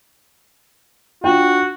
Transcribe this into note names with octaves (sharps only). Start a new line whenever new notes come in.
D4 F4 F#4 G5